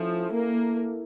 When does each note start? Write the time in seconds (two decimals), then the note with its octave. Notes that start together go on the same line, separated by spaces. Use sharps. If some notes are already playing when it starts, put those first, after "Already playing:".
Already playing: F3 A3 C#4 E4
0.32 A#3